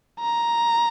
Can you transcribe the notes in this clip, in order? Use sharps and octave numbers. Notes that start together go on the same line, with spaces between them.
A#5